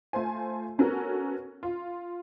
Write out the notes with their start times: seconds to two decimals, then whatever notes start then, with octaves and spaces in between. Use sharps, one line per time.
0.13 A3 F4 C5 G#5
0.78 B3 C#4 F#4 A4 A#4
1.63 F4